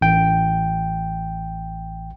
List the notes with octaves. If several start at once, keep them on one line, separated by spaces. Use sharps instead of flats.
A1 G5